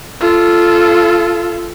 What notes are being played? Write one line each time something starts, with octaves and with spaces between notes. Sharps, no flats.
F4 A4